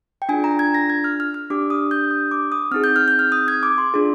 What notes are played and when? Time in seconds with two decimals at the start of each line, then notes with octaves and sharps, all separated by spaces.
0.22 G5
0.29 D4 F4 G#4 G#5
0.44 A#5
0.59 G#6
0.74 A#6
0.90 G#6
1.04 F6
1.20 F6
1.34 F6
1.50 D4 G4 D6
1.70 D#6
1.91 G6
2.11 D#6
2.31 D6
2.52 D#6
2.71 C4 D#4 G#4 F6
2.84 G6
2.96 F6
3.08 G6
3.19 F6
3.32 D#6
3.48 G#6
3.63 D6
3.78 C6
3.94 D4 F4 G#4